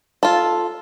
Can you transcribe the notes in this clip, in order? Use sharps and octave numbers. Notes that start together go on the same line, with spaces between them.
F4 A4